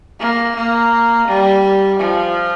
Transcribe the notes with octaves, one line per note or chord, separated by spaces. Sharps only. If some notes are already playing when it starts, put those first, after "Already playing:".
A#3
A#3
G3
F3